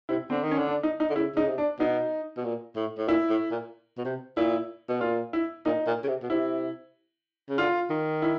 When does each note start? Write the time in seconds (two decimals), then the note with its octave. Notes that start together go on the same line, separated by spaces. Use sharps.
0.09 C3 E4
0.30 D3 C4
0.43 D#3
0.51 C#4
0.58 D3
0.67 D4
0.83 D#4
1.00 D#4
1.10 D3
1.15 C#3 E4
1.35 C#3 D#4
1.47 C3
1.58 D4
1.79 B2 D#4
2.37 B2
2.44 A#2
2.76 A2
2.98 A2
3.08 A#2 E4
3.30 A2
3.51 A#2
3.97 B2
4.05 C3
4.37 A#2 E4
4.89 B2
5.01 A#2 F4
5.33 E4
5.66 A#2 D#4
5.87 A#2
6.04 C#3
6.08 C3
6.22 B2
6.30 C3 E4
7.49 C#3
7.58 D3 F4
7.90 D#3
8.22 E4